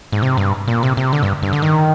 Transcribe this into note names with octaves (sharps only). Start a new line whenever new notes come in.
G#2
C3
G2
A#2
C3
C3
D3
G2
G2
D3
D#3